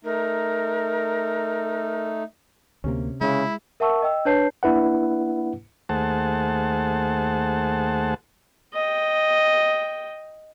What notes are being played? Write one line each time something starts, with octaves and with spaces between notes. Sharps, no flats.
A3 D#4 A#4
D2 C3 A#3 C#4
C#3 G#3 E4
A#4 E5 F#5 A5 C#6 E6
D#5 G5 E6
D4 B4 C#5 A5 G6 C7
A#3 D4 E4 B4 F#5
D#2 A3 G#4 C5 F#5 A5
D#5 G5